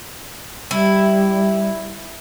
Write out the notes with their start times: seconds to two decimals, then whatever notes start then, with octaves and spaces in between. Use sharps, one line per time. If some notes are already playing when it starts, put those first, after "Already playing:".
0.71 G3 E4